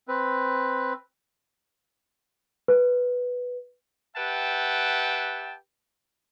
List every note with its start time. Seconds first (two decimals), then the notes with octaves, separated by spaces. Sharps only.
0.08 C4 B4
2.68 B4
4.17 G4 B4 E5 F#5 G5 A5